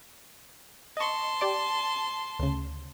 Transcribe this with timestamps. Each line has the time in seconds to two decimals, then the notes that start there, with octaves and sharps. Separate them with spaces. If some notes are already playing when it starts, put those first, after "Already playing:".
0.97 D#5 A5 C6 C#6
1.41 G4 D5 D6
2.39 D2 C#3